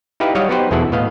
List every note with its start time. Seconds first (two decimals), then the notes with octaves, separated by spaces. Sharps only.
0.20 D#4 E4 G4 B4 F5
0.35 F#3 G3 F#4 C#5 D#5 F5
0.49 B3 D#4 F#4 G4 B4 C5
0.71 E2 B2 E4 G#4 A4 F#5
0.92 A2 B3 D#5 F5